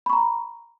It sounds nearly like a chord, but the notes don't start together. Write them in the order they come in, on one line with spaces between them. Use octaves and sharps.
B5 C#6 A#5